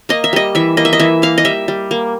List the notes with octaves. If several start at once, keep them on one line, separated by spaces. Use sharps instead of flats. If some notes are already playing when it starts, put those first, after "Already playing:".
A#3 D#5
E5
G3 D#5
E3 E5
A#3 D#5
E5
D#5
E3 E5
A#3 F5
D#5
G3 E5
G3
A#3